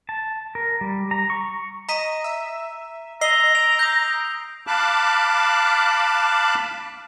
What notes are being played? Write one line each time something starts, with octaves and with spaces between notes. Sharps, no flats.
A5
A#4
G3
A#5
C#6
D#5 A#5 B6 D#7
E5
D#5 A#5 E6 C7 G7
D7 F7
D#6 G6
F5 A5 B5 D6 F#6